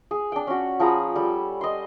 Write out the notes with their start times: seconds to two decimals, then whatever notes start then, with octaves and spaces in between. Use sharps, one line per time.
0.11 G#4
0.32 D4 G5
0.47 C#4 F#4
0.80 F3 G#4 A#5 B5
1.16 G3 A4
1.61 D#5 C6